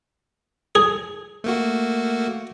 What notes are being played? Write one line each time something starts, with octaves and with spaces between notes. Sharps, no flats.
G#4
A3 A#3 F#4